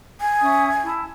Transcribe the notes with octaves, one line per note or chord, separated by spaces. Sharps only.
G#5
C#4 E5 D#6
E4 A5